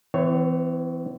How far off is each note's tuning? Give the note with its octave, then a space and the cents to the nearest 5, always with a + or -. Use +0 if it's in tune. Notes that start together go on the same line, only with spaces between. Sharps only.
E3 +0 C4 -45 C#5 +0